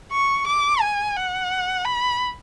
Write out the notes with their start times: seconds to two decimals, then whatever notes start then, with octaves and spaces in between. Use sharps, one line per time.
0.12 C#6
0.47 D6
0.81 G#5
1.16 F#5
1.85 B5